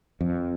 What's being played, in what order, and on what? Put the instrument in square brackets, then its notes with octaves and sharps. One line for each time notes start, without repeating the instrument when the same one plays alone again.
[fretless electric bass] F2